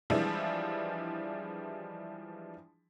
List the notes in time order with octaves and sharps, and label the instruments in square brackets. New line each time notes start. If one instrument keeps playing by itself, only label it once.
[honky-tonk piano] E3 F3 G3 G#3 D4 E4